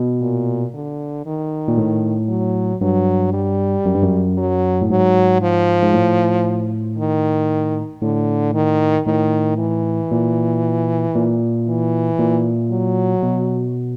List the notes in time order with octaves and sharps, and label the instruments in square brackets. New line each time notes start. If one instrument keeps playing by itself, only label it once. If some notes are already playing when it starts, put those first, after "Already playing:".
Already playing: [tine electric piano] B2
[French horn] A#2
D3
D#3
[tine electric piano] A#2
A2
[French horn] F#3
[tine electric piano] G2 [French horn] F#3
[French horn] G3
[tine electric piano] F#2
G2
F#2
[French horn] F#3
[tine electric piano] A2
[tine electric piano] G#2 [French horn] F#3
[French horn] F3
[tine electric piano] G#2
A2
[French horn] D#3
[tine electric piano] A2 [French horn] D3
[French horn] D#3
[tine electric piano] A2 [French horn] D#3
[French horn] E3
[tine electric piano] A#2
A#2
[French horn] E3
[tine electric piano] A#2
[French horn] F#3
[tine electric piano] B2